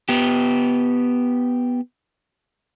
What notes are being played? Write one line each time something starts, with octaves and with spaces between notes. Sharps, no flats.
B3 G4